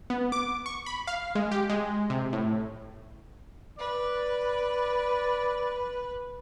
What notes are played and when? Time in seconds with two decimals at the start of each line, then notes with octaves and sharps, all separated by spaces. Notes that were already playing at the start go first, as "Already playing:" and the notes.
0.10 B3
0.32 D6
0.66 C#6
0.86 B5
1.07 F5
1.35 G#3
1.51 G4
1.69 G#3
2.10 C3
2.33 A2
3.78 B4 D5